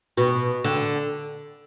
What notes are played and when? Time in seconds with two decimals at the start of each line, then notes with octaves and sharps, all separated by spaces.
0.17 B2
0.64 D3